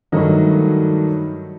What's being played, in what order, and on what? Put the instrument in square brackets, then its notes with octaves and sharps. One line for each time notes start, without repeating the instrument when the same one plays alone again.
[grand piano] G2 D#3 F#3 A3 D#5